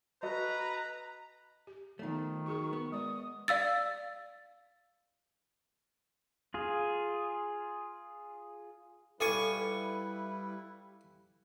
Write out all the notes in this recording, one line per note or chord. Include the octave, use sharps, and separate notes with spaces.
F#4 A4 B4 D#5 A#5
G4
D#3 F3 F#3 A3 B3 D#4
F#4 G#4 A#4 C#6
B3
G#3 D5 D#6
D5 F5 E6 A6
F4 G#4
G3 E4 F4 A4 B4 G#5 C#6 D6